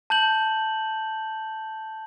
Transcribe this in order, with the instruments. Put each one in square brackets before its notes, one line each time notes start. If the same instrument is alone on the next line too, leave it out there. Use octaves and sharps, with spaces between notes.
[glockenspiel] A5 G6 F#7